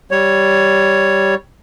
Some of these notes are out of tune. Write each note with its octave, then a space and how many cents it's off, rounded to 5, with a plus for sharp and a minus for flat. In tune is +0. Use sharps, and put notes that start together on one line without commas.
G3 -5 C#5 +0